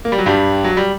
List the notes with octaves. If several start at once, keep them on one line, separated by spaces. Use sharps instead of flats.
A#3
G3
F#3
G2 G3
F#3
G3